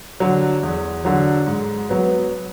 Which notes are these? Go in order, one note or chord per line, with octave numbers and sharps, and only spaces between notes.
D3 F#3
E2
D3 F#3
G#2
F#3 B3